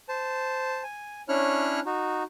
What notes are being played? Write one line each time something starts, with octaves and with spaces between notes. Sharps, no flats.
C5 A5
G#5
C#4 D4 E4 C#5 F6 F#6
D#4 F#4